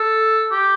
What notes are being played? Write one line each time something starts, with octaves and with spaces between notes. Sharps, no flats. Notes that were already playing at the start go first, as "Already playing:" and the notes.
Already playing: A4
G4